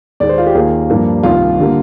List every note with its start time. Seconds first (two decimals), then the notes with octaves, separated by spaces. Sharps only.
0.20 D#2 D#3 G#3 D#4 D5
0.29 C5
0.38 F4
0.46 G4
0.55 D#2 D#3 A#3 F4 G#4
0.90 G2 F3 A#3 D4
1.23 C2 C3 D#3 F4
1.60 D3 G3 A#3